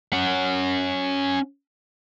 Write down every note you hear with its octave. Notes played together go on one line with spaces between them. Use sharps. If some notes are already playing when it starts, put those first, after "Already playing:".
C#4 F#5